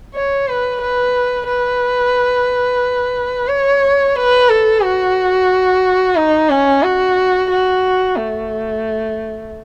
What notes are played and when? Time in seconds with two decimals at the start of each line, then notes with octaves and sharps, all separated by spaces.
0.15 C#5
0.48 B4
0.81 B4
1.48 B4
3.48 C#5
4.15 B4
4.49 A4
4.83 F#4
6.16 D#4
6.50 C#4
6.83 F#4
7.50 F#4
8.17 A3